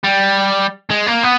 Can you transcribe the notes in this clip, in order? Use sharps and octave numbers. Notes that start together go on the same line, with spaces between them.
G3
G#3
A#3
B3